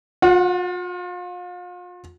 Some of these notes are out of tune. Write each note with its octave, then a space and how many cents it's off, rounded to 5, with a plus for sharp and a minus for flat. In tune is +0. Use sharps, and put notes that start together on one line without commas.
F4 +40 F#5 -10